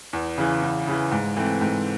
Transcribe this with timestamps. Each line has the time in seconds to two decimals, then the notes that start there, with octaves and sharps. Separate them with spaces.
0.13 E2
0.38 C#3 E3
0.62 E2
0.87 C#3 E3
1.11 G#2
1.36 E3 A3 C4
1.61 G#2